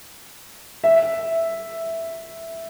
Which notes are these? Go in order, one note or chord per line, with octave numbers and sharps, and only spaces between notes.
E5